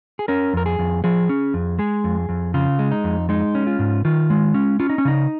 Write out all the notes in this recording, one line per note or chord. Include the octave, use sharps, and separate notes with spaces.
G#4
C#4 A#4
F2 A#4
G#4
F2
F3 G#4
C#4
F2
G#3 G#4
F2
F2
C#3 F4
G#3
D#4
F2
G#3 D#4
C#4
F4
G#2
D#3 F4
G#3
C#4
C#4 F4
D#4
C#4
C#3 D#4